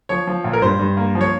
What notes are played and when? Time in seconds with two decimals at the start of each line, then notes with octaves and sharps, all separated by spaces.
0.09 F3 C#5
0.27 F3
0.44 A#2
0.53 A#4
0.62 G2 C5
0.79 G2
0.97 A#3
1.15 F3
1.21 C#5